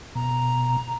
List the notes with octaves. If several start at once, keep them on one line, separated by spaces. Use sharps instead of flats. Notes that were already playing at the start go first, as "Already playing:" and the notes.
B2 A#5